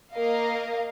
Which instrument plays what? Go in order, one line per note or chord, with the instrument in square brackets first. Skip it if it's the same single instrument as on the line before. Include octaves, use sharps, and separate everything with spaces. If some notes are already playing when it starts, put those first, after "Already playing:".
[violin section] A#3 A#4 D#5 F5